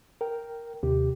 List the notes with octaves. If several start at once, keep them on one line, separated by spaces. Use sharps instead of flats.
A#4 G5
D#2 C3 G4